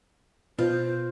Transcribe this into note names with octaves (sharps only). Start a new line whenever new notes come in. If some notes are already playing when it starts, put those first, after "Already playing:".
B2 F4 C5